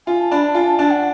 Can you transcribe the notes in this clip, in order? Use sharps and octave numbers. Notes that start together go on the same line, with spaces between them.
F4 G#5
A5
D4 B5
A5
F4 G#5
A5
D4 A5
F#5